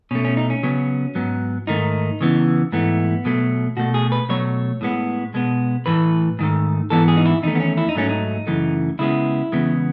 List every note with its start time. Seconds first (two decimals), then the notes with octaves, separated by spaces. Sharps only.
0.11 B2 C#4
0.15 A3
0.25 C#4
0.37 D#4
0.50 C#4
0.63 C#3 F#3 B3
1.15 G#2 F#3 B3
1.67 G#2 D#3 A3 D#4
2.21 C#3 E3 B3
2.72 G#2 E3 A3 B3
3.25 B2 F#3 A3
3.77 B2 A3 F#4
3.94 G#4
4.12 B4
4.29 B2 F#3 A3 C#5
4.81 A2 G#3 B3
5.34 B2 G#3 B3
5.86 A2 E3 A3 B4
6.39 G#2 D#3 A3
6.90 G#2 E3 B3 A4
7.08 G#4
7.17 D#4
7.26 E4
7.43 E2 D#3 A3 D#4
7.55 B3
7.60 C#4
7.77 E4
7.89 D#4
7.95 G#2 F#3 A3 C#4
8.09 D#4
8.47 F#2 C#3 E3 A3
8.99 C#3 G#3 B3 E4
9.52 E2 C#3 G#3 B3